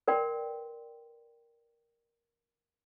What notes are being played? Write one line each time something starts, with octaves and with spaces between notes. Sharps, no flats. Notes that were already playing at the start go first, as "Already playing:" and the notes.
A#4 B4 D5 G5 C6